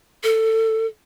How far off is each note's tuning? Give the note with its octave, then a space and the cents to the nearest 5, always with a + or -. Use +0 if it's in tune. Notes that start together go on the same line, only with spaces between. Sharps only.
A4 +15